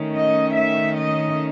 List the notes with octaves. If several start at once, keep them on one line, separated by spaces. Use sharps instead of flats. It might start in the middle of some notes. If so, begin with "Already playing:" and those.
Already playing: D#3 A3 C#4
D#5
E5
D#5